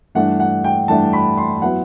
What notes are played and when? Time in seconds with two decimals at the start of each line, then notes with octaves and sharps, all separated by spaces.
0.15 G2 E3 A3 D4 F#5
0.40 F#5
0.64 G5
0.88 G2 E3 A3 D4 A5
1.13 B5
1.37 C6
1.62 F#3 B3 E4 F#5